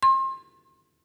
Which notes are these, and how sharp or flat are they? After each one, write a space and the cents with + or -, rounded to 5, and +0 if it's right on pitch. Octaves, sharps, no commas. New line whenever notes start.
C6 +35